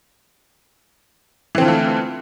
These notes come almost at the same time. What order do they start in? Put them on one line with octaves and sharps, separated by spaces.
E3 C4 D3 F4 A3